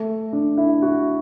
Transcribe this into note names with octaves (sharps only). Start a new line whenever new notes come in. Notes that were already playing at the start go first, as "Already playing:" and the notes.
Already playing: A3
D4
E4
F#4